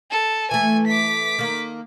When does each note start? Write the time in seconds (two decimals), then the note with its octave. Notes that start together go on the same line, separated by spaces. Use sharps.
0.11 A4
0.51 E3 A3 G#5
0.87 D6 B6
1.39 D#3 A#3